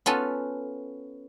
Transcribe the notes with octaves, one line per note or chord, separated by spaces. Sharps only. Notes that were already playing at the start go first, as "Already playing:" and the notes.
B3 C#4 F4 A4 B4